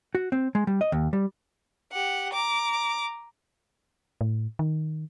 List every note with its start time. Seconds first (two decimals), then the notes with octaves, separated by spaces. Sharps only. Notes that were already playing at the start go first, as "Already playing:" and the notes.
0.15 F#4
0.32 C4
0.55 G#3
0.67 G3
0.81 D#5
0.92 D#2
1.13 G3
1.92 G4 F#5
2.33 A#5 D6
4.21 A2
4.59 D#3